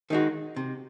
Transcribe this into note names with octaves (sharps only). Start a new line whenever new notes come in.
D#3 G#3 D#4 F#4
C3